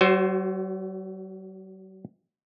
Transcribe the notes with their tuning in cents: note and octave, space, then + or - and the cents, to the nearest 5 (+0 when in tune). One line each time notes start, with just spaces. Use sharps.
F#3 +45 F#4 +5 C5 +0